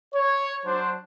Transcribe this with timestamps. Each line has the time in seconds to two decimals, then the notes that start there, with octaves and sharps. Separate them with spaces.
0.14 C#5
0.64 F#3 D4 C5